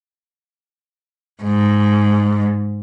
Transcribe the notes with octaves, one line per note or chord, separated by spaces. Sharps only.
G#2